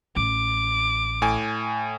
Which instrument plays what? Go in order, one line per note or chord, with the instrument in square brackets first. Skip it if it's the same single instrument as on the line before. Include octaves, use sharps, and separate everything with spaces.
[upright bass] A1 [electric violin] D6
[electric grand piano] A2 G#5